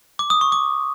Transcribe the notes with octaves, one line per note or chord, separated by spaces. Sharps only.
D6
D#6
C#6
D6